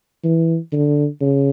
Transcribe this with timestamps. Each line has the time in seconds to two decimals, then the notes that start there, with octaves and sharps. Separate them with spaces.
0.24 E3
0.73 D3
1.21 C#3